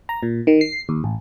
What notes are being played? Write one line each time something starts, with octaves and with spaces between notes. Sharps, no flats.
A#5
A#2
D#3
C7
D#2
A1